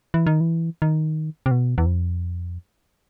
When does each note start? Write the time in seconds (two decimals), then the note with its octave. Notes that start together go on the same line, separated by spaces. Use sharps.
0.14 E3
0.27 D#3
0.41 E3
0.82 D#3
1.46 C3
1.51 B2
1.78 E2
1.86 F2